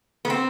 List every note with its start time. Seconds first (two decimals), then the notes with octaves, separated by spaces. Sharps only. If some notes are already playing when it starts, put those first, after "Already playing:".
0.25 B3
0.30 C4